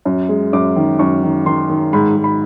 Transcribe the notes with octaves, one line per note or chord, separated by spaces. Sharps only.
F#2
G#3
F#2 D6
D#3
F#2 C#6
D#3
D#3 C6
D#3
G#2 B5
G#2
B5